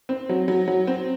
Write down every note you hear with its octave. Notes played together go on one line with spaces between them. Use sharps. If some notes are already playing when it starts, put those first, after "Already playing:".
C4
F#3
F#3
F#3
C4